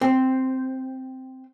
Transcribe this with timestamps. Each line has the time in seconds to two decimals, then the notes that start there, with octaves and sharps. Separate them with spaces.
0.01 C4